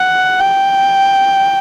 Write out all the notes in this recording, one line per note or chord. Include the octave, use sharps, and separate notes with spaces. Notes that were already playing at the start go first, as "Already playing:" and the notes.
Already playing: F#5
G5